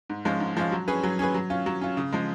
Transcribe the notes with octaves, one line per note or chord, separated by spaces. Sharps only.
G#2
F3 G#3 C#4 F4
G#2
F3 G#3 C#4 F4
F#3
C#4 G#4 B4
F#3
C#4 G#4 B4
F#3
C#4 F4
F#3
C#4 F4
C#3
F3 G#3